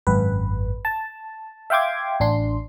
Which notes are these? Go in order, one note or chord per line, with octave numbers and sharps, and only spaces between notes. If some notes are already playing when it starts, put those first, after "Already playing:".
G#1 F#2 B4
A5
E5 F5 G5 C6 D6 G#6
A1 D4 C6